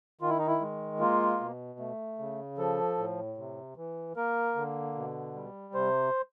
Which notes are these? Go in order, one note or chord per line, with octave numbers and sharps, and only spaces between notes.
D#3 F4
E4
D#4
E4
G#3
A#3 F4
B2
A3
C#3
F3 A4
A2
C3
E3
A#3 A#4
D3
B2
G3
C3 C5